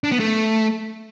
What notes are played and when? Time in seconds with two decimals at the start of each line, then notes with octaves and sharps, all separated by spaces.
0.04 D4
0.12 B3
0.20 A3